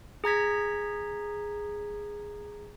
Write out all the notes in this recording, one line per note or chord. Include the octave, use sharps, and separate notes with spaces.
G#4 A#5 G#6 B6